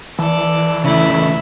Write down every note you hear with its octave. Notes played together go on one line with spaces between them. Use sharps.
E3 A4 D5
C#3 A3 E4